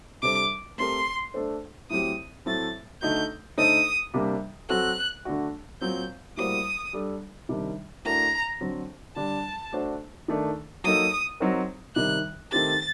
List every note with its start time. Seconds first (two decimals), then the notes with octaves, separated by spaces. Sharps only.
0.22 C3 G3 D4 A4 C5 D6
0.78 A3 C4 G4 A#4 C6
1.34 A3 D4 A4 C5
1.90 A2 F#3 C4 G4 D#6
2.46 A2 F#3 A3 C4 A6
3.02 D3 A3 D#4 F#4 G6
3.58 D3 A3 D#4 A4 C5 D#6
4.14 C3 G3 A#3 D4
4.69 F#3 C4 F#4 A4 F#6
5.25 D3 A3 D4 F#4
5.81 A#2 F#3 C4 G6
6.37 A2 G3 A#3 F#4 C5 D#6
6.93 G3 D4 A4
7.49 C3 D#3 G3 D4
8.05 A2 A3 D4 F#4 A#4 A#5
8.61 D3 F#3 C4
9.16 D3 G3 D4 A5
9.73 A3 D4 F#4 C5
10.28 D#3 A3 D4
10.84 F#3 A#3 D#4 A4 D#6
11.40 F#3 C4 D#4 F#4 A#4
11.96 C3 D#3 G3 F#6
12.52 D#3 A3 C4 G4 A6